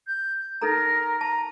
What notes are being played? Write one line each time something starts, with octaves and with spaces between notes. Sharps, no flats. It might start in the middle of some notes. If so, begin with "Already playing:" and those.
G6
D#4 A4 A#4 A#5
A5 A#5